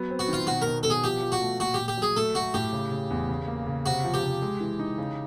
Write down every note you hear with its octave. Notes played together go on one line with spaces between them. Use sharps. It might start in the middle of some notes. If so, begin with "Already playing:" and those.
Already playing: F#3 B3
C4
F#4
D#3 F4
B2 F#4
B2 A#4
B2 A4
G#4
F3 G4
F3
F#4
A3
A#2 F#4
A#2 G4
G4
F#3 G#4
A3 A4
A3 F#4
A2 G4
C#3
C#3
E2
C#3
A#3
C#3
C3 F#4
F3
G4
C3
G#3
E3
D#4
C#3